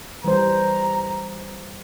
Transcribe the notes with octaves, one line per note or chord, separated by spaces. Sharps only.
E3 G3 C5 A#5